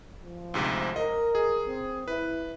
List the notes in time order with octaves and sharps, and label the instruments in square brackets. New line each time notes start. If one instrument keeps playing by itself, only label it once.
[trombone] F3
[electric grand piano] D2 G#2 C3
[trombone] A#4 [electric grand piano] D#5
[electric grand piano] G#4
[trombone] C4
[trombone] E4 [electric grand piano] B4